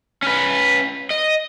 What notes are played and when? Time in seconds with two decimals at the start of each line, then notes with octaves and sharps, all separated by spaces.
0.23 C#4 B4
1.10 D#5